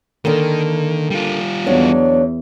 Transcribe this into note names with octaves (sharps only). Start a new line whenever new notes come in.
D3 D#3 A#3
G3 F4
E2 F#3 D4 C#5